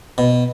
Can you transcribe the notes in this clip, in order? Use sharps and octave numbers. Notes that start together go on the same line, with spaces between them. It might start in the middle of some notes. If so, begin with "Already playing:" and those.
B2